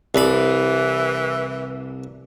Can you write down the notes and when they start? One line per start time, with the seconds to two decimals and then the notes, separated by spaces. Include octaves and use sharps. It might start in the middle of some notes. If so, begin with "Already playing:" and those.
0.15 C2 E3 B5